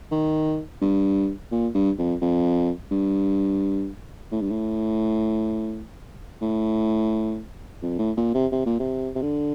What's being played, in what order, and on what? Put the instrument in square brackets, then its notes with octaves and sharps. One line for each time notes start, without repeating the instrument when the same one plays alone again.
[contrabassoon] D#3
G2
A#2
G2
F2
F2
G2
A2
G2
A2
A2
F2
A2
A#2
C3
C3
A#2
C3
C3
D3